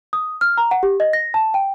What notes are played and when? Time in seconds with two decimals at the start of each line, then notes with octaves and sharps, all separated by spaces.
0.13 D#6
0.41 F6
0.57 A#5
0.71 F#5
0.83 G4
1.00 D#5
1.13 A#6
1.34 A5
1.54 G5